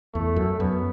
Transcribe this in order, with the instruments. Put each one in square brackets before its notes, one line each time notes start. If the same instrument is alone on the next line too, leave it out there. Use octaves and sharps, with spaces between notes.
[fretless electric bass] E2 [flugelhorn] A3
[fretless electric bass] F#2
[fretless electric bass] F#2 [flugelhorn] B3